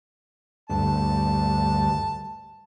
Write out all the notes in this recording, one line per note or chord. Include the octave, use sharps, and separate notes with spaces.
D2 G2 A5